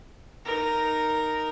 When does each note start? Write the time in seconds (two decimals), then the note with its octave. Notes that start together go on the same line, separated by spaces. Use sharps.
0.45 D#4 A#4